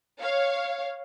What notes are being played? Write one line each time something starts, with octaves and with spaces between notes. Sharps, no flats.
C#5 F5